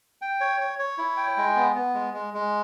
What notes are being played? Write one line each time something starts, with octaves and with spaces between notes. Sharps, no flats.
G5
C#5
C#5
C#5
E4
G5
G#3
B3
B3
G#3
G#3
G#3